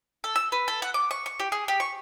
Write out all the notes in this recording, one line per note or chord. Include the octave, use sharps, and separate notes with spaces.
A4
E6
B4
A4
F#5
D6
C#6
C#6
G4
G#4
G4
C#6